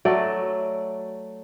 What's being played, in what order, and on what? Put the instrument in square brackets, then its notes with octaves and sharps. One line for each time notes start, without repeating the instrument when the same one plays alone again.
[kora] F#3 A3 D5